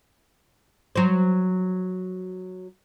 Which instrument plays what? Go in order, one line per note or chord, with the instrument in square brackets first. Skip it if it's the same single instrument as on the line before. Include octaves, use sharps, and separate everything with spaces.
[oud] F#3 C5